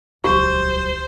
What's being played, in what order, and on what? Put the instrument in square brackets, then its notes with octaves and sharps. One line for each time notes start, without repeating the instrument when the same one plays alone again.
[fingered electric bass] D#1 F#3 [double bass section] C#2 [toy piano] G4 [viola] C5